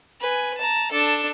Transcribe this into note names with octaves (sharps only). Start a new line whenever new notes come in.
B4 G#5
A5 A#5
D4 A4